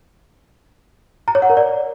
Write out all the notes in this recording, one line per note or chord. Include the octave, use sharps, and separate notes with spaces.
A#5
C#5
F#5
A#4
D5